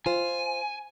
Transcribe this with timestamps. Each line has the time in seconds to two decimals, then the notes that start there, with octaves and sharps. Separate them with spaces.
0.06 F4 C5 G#5